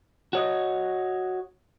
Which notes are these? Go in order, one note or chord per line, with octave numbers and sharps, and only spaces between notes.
F#4 C#5 D#5